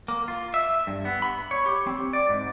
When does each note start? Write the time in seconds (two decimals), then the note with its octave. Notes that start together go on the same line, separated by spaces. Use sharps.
0.08 A#3
0.28 F4
0.54 E5
0.87 G2
1.05 B3
1.22 B5
1.51 C#5
1.66 G4
1.87 C4
2.13 D5
2.29 G#2